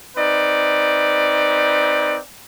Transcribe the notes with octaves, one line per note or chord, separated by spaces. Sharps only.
C4 D#4 B4 D5